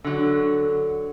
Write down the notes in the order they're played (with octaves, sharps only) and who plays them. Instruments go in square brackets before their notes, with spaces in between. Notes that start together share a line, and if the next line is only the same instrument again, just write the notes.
[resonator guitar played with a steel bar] D3 F#3